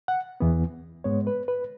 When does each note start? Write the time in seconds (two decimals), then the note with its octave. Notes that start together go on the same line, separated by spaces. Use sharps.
0.08 F#5
0.40 E2 E3 B3
1.04 G#2 G#3 B3 C#5
1.27 B4
1.48 B4